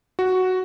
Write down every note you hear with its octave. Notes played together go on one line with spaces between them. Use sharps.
F#4